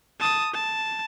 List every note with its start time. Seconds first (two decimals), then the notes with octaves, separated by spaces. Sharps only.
0.20 A5 D#6
0.54 A5